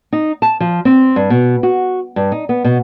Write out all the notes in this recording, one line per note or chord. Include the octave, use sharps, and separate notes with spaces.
D#4
A5
F3
C4
G2
B2
F#4
G2
D#4
B3
B2